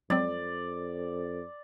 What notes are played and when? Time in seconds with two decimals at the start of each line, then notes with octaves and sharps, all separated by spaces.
0.10 F2 F#3 G#3 C4 D5